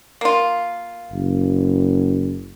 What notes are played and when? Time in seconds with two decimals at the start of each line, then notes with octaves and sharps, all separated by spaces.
0.21 A#3 F4
1.12 F#1